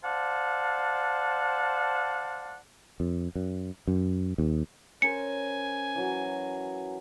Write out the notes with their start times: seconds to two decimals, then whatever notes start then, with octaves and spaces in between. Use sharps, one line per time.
0.04 C5 D5 F5 F#5 A5
3.00 F2
3.35 F#2
3.87 F#2
4.38 D#2
5.02 C#4 A#4 C5 G#5 C#7
5.95 E3 F#3